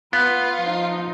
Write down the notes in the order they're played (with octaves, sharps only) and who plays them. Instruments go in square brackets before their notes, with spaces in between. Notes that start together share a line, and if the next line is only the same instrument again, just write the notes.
[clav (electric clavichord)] B3 [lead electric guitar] F4 [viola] B4 F#5
[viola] F3 D#4